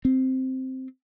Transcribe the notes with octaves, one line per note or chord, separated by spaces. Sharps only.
C4